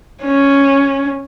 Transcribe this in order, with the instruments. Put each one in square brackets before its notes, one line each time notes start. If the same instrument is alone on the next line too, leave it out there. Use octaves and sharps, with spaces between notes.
[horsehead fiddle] C#4